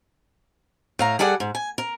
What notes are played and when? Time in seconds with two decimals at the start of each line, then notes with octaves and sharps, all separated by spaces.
0.99 A2 F5 A#5
1.19 G3 G#4 A4 D5 F#5
1.40 G#2
1.55 G#5
1.78 A#4